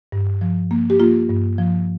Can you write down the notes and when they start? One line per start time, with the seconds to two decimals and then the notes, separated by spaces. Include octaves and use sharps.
0.12 G2
0.41 F3
0.71 A#3
0.90 G4
1.00 A#3 F4
1.29 G2
1.58 F3